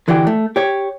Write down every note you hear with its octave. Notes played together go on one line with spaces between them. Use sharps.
D3 E3 D4 F#4 G4
A3
G4 C#5